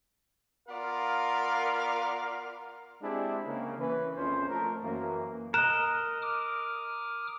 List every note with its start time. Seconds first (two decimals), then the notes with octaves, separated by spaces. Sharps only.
0.68 B3 F4 A#4 D5 F5
3.02 G#3 C4 D4 E4 G4 G#4
3.46 C#3 A#3
3.78 E3 C#4 B4
4.16 A#1 F2 C#4 C5
4.49 F3 A3 A#4
4.83 F#2 E3 A#3
5.54 A#4 D#5 F#6 E7
6.22 D6 D#6 F6